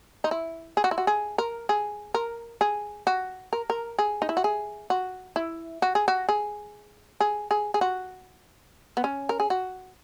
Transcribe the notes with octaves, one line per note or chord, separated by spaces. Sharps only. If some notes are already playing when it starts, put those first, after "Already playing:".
D#4
E4
G#4
F#4
E4
F#4
G#4
A#4
G#4
A#4
G#4
F#4
A#4
A#4
G#4
D#4
E4
F#4
G#4
F#4
E4
F#4
G#4
F#4
G#4
G#4
G#4
G#4
F#4
B3
C#4
A#4
G#4
F#4